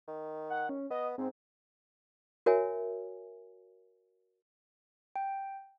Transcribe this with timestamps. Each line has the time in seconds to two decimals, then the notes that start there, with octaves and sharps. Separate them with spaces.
0.08 D#3
0.50 F#5
0.69 C#4
0.91 B3 D#5
1.18 G#2 C4
2.46 F#4 A#4 C#5 E5 G#5
5.16 G5